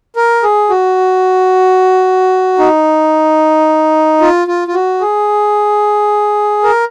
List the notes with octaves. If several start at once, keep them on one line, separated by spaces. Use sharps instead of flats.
A#4
G#4
F#4
D#4
F4
F4
F4
F#4
G#4
A#4